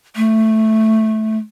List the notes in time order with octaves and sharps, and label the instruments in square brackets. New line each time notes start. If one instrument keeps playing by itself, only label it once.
[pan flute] A3